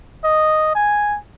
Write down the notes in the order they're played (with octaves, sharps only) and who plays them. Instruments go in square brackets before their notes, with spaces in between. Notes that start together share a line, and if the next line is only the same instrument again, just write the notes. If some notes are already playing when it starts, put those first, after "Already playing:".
[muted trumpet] D#5
G#5